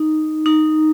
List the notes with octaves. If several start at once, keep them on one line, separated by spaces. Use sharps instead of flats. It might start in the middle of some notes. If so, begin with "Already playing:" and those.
Already playing: D#4
D#4